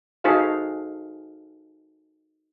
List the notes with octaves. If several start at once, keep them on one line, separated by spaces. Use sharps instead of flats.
D#4 F#4 G#4 A4 C5 F5